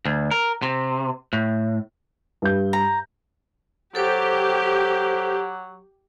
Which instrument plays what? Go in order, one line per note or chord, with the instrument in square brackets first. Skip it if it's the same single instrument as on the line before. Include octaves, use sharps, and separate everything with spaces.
[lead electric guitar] D2
A#4
C3
A2
[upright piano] G2 G6
[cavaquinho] A#5
[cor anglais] F#3 [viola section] G4 [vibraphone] A4 C5